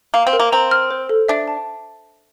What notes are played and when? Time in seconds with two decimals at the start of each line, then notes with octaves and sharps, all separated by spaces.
0.14 A#3 F5
0.27 C4
0.33 A#4
0.40 A#3
0.52 C4 A#5
0.71 F6
0.91 C5
1.09 A4
1.29 D4 E5
1.48 A5